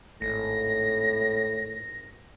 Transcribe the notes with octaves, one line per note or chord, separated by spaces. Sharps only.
G#1 A2 A#6